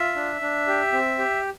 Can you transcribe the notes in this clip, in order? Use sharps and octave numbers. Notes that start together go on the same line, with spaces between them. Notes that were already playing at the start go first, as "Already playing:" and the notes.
Already playing: F4 E5
D4
D4
G4
C4
G4